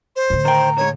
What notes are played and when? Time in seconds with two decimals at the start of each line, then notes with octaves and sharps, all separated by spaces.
0.16 C5
0.30 A2 D3
0.45 D#3 G5 A#5
0.77 D#2 G#2 C#5